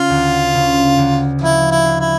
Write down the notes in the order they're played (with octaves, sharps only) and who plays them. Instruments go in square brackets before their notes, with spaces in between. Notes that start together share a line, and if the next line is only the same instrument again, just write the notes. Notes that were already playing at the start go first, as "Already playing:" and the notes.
Already playing: [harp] C#3 [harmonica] F4
[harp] D2
C#3
D2
[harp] F3 [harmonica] E4
[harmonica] E4
[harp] D4
[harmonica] E4